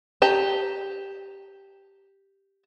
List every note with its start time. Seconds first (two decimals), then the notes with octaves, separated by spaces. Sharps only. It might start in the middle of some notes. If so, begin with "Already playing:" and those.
0.22 G4 A5 A#5